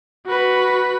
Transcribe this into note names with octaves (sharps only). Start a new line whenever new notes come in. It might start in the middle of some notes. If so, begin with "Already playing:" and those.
F#4 B4